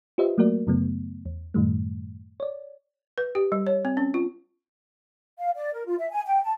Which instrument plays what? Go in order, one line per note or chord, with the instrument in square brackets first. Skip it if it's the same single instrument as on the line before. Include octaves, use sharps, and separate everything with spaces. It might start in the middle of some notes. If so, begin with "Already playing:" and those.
[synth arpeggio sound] F4 G4 B4 C5 D#5 E5
F#3 A3 A#3 F#4 A#4 D5
F#2 C#3 F#3 A3 B3
E2
F#2 A2 D#3 G3 A3
C#5 D5
[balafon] B4
G4
G3
C#5
C4
C#4
F4
[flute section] F5
D5
A#4
F4
E5
G#5
G5
A5